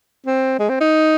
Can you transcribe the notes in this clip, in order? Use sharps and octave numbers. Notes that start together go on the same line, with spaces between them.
C4
G#3
C4
D#4